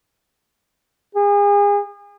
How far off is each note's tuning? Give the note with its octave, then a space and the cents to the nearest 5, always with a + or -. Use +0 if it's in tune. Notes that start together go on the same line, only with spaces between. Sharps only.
G#4 -35